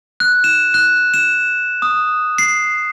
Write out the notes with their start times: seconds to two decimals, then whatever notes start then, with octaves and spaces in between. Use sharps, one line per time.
0.20 F#6
0.44 E7
0.74 F#6
1.14 E7
1.82 D#6
2.38 C7